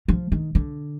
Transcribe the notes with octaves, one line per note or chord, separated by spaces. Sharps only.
F3
D#3
D3